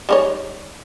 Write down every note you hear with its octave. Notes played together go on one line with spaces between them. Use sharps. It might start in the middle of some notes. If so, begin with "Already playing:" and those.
G3 D#4 C#5